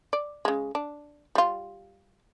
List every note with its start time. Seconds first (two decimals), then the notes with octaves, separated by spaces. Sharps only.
0.13 D5
0.45 C#3 G#3
0.75 D4
1.35 G3 F4